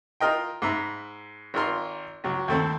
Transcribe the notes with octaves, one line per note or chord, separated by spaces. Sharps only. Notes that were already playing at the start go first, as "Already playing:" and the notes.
F4 A#4 D#5 G5
G#2 E5 A#5 B5
G#1 F4 A#4 C6
C#2 F#3
D#2 A3 C4